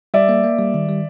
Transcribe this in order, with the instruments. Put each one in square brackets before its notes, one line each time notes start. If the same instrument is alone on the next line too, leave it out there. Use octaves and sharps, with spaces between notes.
[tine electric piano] G3 [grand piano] D5 E5
[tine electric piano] A#3
A#3
G3
D#3
G3